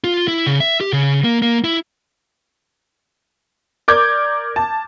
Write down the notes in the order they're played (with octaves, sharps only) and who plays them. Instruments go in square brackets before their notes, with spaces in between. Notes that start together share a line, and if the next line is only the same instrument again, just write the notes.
[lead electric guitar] F4
E4
C#3
E5
G4
C#3
A#3
A#3
E4
[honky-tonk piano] A#4 D5 D6 G6 G#6
A5